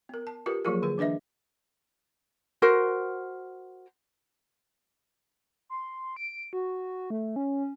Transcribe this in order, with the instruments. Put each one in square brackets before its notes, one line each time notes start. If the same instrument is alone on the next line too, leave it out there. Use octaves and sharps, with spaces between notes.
[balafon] B3 A#4
A5
F4 G4 A#4 B4
F3 F#3 A#3 F4 G#4 A#4
D3 G#4 B4
E3 D4 B4 D#5 E5
[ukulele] F#4 A#4 C5
[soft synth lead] C6
D7
F#4
A3
C#4